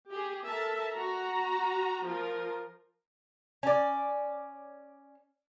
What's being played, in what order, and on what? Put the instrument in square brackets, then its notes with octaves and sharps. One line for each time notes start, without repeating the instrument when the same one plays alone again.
[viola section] G4 G#4
A4 A#4 E5 A5
F#4 A#5
F3 F4 A#4
[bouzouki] C#4 D5